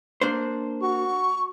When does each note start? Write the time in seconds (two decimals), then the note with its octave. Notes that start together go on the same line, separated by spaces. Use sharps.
0.21 A#3 D4 C5
0.82 F#4 C#6